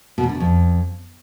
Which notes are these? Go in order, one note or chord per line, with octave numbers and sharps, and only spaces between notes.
B2
E2
D3
B2
F2